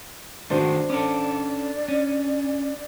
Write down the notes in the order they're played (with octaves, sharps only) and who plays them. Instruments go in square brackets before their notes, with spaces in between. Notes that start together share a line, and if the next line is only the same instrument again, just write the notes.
[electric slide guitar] D#3 G#3 A3 [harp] D4 C5 [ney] F#4
[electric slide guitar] C#4 A4 [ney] D5 [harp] D6
[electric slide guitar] C#4